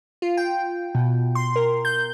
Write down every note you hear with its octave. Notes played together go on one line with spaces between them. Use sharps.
F4
G5
B2
C6
A#4
G6